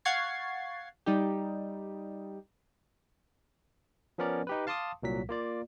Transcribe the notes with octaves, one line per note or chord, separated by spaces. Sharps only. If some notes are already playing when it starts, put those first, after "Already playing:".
F5 F#5 C#6 G#6 A6 C7
G3 D#4 G4
F3 B3 C#4 A#4 D5
D#4 G4 B4
F5 A5 C6 D6 D#6
C2 A#2 F#3 B6
A#3 F4 D5